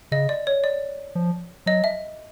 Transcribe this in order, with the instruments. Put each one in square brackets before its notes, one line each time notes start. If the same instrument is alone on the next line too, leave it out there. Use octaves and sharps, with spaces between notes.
[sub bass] C#3 [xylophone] D#5
[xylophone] D5
C#5
D5
[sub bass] F3
[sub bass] F#3 [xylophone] D#5
[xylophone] E5